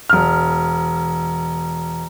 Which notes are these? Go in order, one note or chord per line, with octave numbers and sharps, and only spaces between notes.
E1 F6